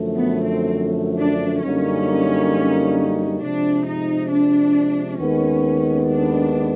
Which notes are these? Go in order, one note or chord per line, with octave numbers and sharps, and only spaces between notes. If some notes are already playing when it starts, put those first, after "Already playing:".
Already playing: F#2 D3 F3 A3
B3
C4
D4
F#2 D3 G3 A#3 C#4 D#4
C3 F3 G#3 D4
D#4
D4
D#2 D#3 G#3 B3 C#4
D4